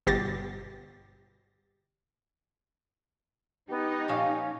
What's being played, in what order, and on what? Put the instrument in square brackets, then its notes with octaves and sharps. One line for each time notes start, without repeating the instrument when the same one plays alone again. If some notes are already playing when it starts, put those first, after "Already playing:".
[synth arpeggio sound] G1 B2 G4 A6 A#6
[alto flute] B3 [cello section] D#4 [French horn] G4
[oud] A#2 F3 F5 [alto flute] C#4